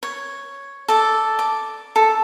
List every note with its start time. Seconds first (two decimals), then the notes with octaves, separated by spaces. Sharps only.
0.03 C#5
0.88 A4 D5
1.39 D6
1.96 A4